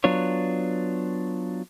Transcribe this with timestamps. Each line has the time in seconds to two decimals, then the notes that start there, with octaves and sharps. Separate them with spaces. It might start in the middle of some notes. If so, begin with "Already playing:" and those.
0.04 F#3 B3 D4 F4 C#5